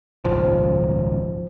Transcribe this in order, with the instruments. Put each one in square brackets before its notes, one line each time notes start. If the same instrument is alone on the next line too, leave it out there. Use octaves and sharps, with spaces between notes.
[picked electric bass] D#1 G#1 C#2 [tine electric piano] F3